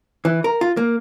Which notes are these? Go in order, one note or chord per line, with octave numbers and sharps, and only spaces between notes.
E3
A#4
F4
A#3